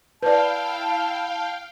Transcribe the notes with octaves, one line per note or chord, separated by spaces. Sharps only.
E4 B4 D5 F5 G5 A5